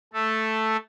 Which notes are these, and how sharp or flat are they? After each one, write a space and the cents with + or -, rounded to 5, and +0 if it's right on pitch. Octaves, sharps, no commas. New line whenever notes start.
A3 +0 A4 +0